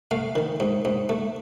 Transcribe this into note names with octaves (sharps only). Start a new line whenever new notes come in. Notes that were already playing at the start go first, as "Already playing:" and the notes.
A3 F5
D#3
G#2
G#2
A3